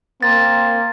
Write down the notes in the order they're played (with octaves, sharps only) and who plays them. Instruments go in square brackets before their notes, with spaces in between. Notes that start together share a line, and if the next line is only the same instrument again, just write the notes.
[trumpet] A#3 [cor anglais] C4 [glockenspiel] A6